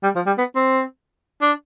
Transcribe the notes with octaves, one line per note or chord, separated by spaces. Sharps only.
G3
F3
G3
B3
C4
D4